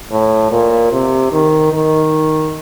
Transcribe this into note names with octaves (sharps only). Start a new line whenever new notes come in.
A2
A#2
C3
D#3
D#3